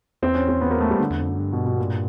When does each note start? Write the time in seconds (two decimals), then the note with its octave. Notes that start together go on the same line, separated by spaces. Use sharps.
0.22 E2 C4
0.35 C#4
0.48 C4
0.61 B3
0.71 A#3
0.81 A3
0.90 G3
1.00 D3
1.10 E2
1.21 F2
1.30 F#2
1.39 G2
1.52 B2
1.66 B2
1.78 A#2